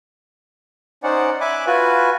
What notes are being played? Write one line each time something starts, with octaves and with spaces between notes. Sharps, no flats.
C#4 D#4 C5 D5 F#5
E5 G#5 B5 D6 F#6
F4 F#4 B4 G#5